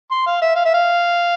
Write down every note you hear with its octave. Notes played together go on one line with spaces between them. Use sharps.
C6
F5
E5
F5
E5
F5